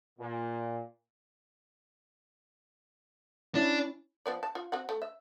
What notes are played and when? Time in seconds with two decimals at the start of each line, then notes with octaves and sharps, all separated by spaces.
0.19 A#2
3.55 C#4 D4 E4
4.26 F3 B3 D5
4.43 A5
4.55 F4
4.72 C4 F#4 F#5
4.89 A3
5.02 E5